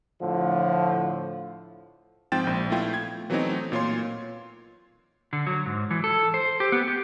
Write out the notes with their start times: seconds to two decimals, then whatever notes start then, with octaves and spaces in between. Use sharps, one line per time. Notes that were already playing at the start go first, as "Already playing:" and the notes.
0.22 A2 D3 F3
2.32 G#2 F3 C4 G5 A6 E7
2.47 A#1
2.70 A3 B3 E4 F4 G5
2.94 G#6
3.30 E3 F#3 A3 B3 C4 D#4
3.72 A#2 F4 C#5 C6
5.33 D3
5.47 F#3
5.66 G#2
5.91 E3
6.04 A4
6.34 C5
6.60 G4
6.72 B3
6.88 G4